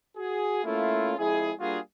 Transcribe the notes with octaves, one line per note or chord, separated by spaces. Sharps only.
F#4 G#4
A3 A#3 C#4 E4 F4
F2 G#3 E4 G#4
G3 A#3 D4 F4 F#4 G#4